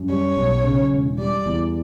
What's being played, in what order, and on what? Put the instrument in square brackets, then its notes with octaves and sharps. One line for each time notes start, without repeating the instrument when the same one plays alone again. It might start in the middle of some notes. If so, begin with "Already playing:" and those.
Already playing: [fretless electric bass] F#2
[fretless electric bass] G3 [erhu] C#5
[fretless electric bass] B1
C#3
E1
[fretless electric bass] G3 [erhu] D5
[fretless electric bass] E2